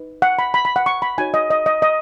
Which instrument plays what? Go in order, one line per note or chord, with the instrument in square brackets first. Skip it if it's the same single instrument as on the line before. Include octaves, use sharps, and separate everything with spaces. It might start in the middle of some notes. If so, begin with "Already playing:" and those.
Already playing: [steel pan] D#4 B4
F#5
B5
B5
B5
F#5
C#6
B5
D#4 F#4 C#5 G#5
D#5
D#5
D#5
D#5